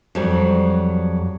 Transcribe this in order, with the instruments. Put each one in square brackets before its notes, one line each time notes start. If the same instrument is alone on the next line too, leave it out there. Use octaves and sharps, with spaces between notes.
[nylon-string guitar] F2 F#3 G3